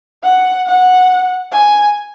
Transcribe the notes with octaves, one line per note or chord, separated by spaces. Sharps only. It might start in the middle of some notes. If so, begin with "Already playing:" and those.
F#5
F#5
G#5